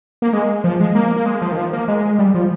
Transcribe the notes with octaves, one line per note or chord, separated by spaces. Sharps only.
A#3
G#3
F3
G#3
A#3
A#3
G#3
F3
D#3
F3
A#3
G#3
G3
F3